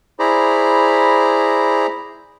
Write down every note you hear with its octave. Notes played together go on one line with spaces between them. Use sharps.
E4 G#4 C5 D5 A#5 B5